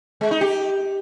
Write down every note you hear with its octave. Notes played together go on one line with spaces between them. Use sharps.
G#3
D#4
G4